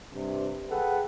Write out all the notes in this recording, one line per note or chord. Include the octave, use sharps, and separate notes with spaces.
G2 C3
G#4 A4 B4 F#5 G5